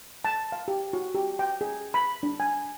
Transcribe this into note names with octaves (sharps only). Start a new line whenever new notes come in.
A5
F5
G4
F#4
G4
G5
G#4
B5
D4
G#5